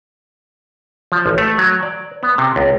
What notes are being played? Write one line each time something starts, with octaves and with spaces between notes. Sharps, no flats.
F3
A1
A3
F#3
D5
B3
C3
C#2